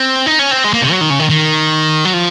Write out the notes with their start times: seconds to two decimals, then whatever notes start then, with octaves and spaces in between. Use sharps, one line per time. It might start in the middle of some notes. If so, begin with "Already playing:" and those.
Already playing: C4
0.26 D#4
0.39 C#4
0.51 C4
0.64 G#3
0.73 A#3
0.82 C3
0.92 F#3
1.01 D#3
1.10 C#3
1.19 D#3
1.30 D#3
2.05 F#3
2.13 F3